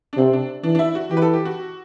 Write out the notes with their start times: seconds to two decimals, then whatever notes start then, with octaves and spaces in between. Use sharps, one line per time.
0.13 D4
0.17 C3 C4
0.33 D4
0.63 E3 D4
0.75 D4
0.79 E4
0.95 F#4
1.10 E3 G4
1.17 B4
1.22 A4
1.33 G4
1.45 F#4